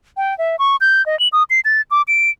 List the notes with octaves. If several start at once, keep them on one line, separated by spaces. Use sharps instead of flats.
G5
E5
C#6
G6
D#5
F#7
D#6
C7
A6
D6
D7